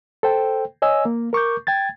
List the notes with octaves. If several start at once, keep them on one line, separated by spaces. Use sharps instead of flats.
A4 C5 G5
C#5 D#5 G#5 E6
A#3
A#4 C#6 D6 G6
G5 G#6 A6